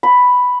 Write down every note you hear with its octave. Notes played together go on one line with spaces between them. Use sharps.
B5